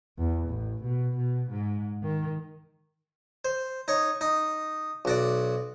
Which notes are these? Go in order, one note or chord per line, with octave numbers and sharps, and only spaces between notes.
E2
A1
B2
B2
G#2
D#3
C5
D#4 C#5
D#4
B1 F#4 D5